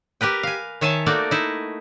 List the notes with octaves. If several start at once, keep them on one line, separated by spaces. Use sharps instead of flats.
G4 A#4 B4 G5
F5 G#5
D#3 C#5 E5 G#5 A5
A3 A#3 D#4 F#4 D5 G5
D#4 E4